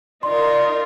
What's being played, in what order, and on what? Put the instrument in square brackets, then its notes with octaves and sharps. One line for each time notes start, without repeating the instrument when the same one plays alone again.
[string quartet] D#4 F4 A#4 [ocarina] D5 [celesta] C6